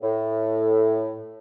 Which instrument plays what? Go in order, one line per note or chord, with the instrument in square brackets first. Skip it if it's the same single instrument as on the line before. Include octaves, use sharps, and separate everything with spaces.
[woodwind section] A2